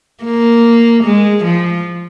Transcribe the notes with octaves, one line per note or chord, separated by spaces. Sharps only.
A#3
G#3
F3